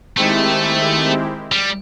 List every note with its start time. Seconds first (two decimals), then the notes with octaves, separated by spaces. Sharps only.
0.17 D#3 G#3 A3 C4 E4 G4
1.52 G3